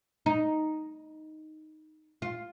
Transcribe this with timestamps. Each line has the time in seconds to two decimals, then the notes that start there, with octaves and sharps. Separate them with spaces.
0.26 D#4
2.22 F4